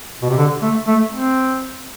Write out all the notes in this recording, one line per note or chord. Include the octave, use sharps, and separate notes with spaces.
B2
C3
D3
A3
A3
C4